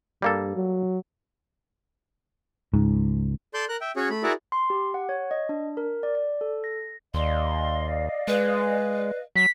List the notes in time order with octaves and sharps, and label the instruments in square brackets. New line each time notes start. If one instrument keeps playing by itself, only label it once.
[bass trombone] G2 [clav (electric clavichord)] G3 A#3 A4
[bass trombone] F#3
[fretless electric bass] C#2 [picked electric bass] G#2
[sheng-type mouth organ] A4 D5 C6 G6
A#4 F#6
E5 G5
C#4 F#4 G#4 C#5
A3 B5
E4 F#4 G#4 A#4 D5 E5
[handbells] C6
G4
F#5
C#5
D#5
D4
A#4
D5
D5
A4
A#6
[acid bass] D#2 [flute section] D5 D#5 F5 [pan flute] C6
[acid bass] G#3 [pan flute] B4
[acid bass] F#3 [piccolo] B6